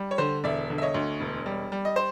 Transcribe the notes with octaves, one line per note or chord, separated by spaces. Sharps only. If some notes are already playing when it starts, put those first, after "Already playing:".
Already playing: G3
C#5
D3 C5
E1 D5 E5
D3
E5
C#5 D#5
D2
E1
G3
G3
D#5
C5